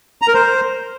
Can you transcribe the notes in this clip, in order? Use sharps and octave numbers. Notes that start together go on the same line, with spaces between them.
A#5
A#4
C5